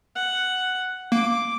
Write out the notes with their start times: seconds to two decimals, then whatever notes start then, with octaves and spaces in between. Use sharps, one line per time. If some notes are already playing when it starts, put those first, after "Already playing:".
0.15 F#5
1.12 A#3 D6